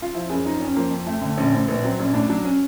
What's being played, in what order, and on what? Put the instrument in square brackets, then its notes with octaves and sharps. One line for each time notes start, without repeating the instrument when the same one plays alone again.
[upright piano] F4
F3 E4
F#1 G#4
F3 D#4
F2 C#4
F3 A#3
F2
F2 A3
D3 A3
A#1 C#4
A2 C4
A#1 B3
F#3 C4
A#1 C#4
A2 D4
F#3 D4
C#4